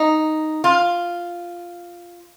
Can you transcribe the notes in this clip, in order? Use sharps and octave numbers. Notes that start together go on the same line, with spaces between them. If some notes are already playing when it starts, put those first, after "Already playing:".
Already playing: D#4
F4